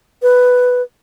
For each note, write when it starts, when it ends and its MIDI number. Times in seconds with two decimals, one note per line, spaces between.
0.22 0.82 71